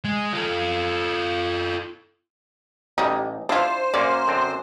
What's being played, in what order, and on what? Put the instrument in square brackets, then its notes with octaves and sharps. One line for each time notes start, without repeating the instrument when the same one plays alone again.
[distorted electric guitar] G#3
F4 A4
[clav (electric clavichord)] A1 [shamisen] G3 D#4
[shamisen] D4 F4 [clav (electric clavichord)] E4 E5 [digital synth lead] C5
[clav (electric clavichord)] F#2 A#3 C#4 [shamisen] D5
[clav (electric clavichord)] F#2 D3 C4